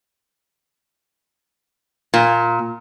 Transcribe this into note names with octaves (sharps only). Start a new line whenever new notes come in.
A#2